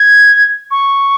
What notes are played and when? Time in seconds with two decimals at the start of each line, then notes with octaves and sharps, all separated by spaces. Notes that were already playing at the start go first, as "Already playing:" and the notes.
Already playing: G#6
0.71 C#6